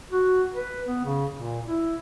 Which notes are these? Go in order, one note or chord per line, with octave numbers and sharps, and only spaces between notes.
F#4
B4
B3
C#3
A#2
E4